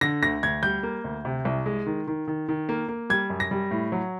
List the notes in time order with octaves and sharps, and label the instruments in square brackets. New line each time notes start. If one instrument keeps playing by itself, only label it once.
[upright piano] D3 A#6
D2 A#6
D2 G#6
G3 G6
A#3
D2
C3
C2
G#3
D#3
D#3
D#3
D#3
A#3
A#3
G3 G#6
F#2
A#6
G3
A2
F#3